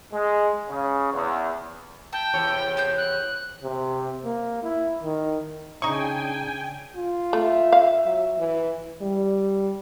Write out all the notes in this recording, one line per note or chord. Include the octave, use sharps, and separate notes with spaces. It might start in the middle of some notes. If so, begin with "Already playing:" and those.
G#3
C#3
E2
E5 G5 A5
E2 C3 C#5
B3 C5 G6
F#6
C3
A#3
E4
D#3
C#3 D4 D#4 G5 G#5 C#6
F4
A3 E5
F5
F#3
E3
G3